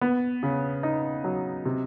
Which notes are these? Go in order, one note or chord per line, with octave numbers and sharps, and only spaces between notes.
B3
C#3
D#4
F#3
C3